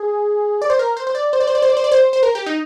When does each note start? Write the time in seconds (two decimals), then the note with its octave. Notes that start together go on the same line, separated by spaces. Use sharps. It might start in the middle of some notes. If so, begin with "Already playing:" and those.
Already playing: G#4
0.62 D5
0.70 C5
0.79 A#4
0.97 C5
1.07 C5
1.15 D5
1.33 C5
1.40 D5
1.47 C5
1.55 D5
1.62 C5
1.69 D5
1.77 C5
1.84 D5
1.92 C5
2.13 C5
2.23 A#4
2.35 G4
2.46 D#4